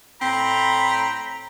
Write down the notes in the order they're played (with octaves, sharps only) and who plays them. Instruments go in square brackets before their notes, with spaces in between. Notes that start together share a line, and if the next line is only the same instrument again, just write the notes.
[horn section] A2 A#5 [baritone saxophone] C4 [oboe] B5